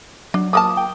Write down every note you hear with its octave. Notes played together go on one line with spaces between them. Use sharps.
F#3 D4
F3 A#3 A5 D6 D#6
G5